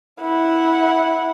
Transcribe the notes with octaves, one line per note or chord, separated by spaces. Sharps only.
E4 F#5